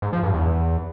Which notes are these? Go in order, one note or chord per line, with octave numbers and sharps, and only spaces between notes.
G#2
F3
G2
E2